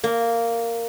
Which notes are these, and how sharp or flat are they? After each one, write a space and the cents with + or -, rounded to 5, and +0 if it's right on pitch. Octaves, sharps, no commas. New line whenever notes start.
A#3 -10